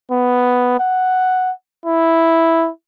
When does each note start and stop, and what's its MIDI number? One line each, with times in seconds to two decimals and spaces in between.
0.11 0.76 59
0.80 1.52 78
1.86 2.70 64